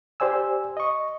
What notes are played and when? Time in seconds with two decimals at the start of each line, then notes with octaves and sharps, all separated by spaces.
0.20 G4 C5 D5 G#5 E6
0.77 D#5 C#6